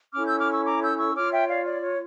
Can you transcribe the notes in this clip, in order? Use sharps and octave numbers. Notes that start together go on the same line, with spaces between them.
C#4 E4 A4 D6 F6
E6 G6
D6 F6
C#6 E6
A#5 D6
E6 G6
C#6 E6
F4 C#5 D6 F6
E5 G5
D5 F5
D5
C#5